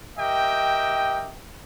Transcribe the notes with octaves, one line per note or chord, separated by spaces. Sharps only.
G4 A#4 D#5 E5 G5